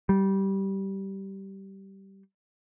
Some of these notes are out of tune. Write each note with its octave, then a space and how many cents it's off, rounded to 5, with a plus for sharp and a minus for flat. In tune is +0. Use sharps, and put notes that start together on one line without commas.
G3 -15